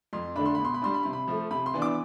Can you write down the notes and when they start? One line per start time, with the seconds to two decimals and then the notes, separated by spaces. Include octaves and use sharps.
0.13 F2 C6
0.36 D3 A3 D4 B5
0.46 C6
0.55 B2 B5
0.65 C6
0.74 B5
0.82 G3 D4 C6
0.94 B5
1.03 C3 C6
1.13 B5
1.28 F3 A3
1.51 C3 B5
1.66 C6
1.74 E3 B3 D4
1.82 D6